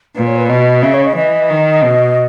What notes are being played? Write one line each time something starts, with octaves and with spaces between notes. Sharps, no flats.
A#2 B4
C#5
B4
B2 D#5
C#3 E5
C#5
D#5
E3 D#5
D#3
B2